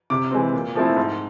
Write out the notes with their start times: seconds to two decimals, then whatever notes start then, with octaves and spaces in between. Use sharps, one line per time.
0.10 C3 D6
0.31 E3 G#3 C4
0.53 A#2
0.75 F3 A3 C4 E4
0.97 G#2